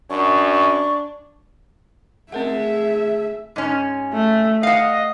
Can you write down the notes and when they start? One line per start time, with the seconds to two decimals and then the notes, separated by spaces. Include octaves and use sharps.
0.10 F#2 D4 C#6
2.32 G#3 A3 C4 A#4 E5 F#5
3.56 G#2 C#4
4.13 A3
4.63 D#5 F5 F#5